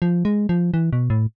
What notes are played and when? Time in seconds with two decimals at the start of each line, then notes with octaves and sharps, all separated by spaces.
0.02 F3
0.25 G#3
0.49 F3
0.74 E3
0.93 B2
1.10 A2